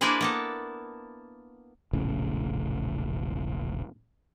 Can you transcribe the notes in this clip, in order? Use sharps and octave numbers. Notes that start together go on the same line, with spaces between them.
A#3 D4 E4 G#4 B4 C5
A#3 B3 A4
E1 A#1 A2 C#3